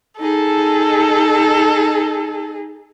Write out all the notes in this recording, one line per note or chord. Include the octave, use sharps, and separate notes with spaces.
D#4 G#4 A4